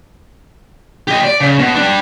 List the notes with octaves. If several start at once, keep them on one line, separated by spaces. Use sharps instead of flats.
G4 D#5
D5
C#3
B2
G3 D4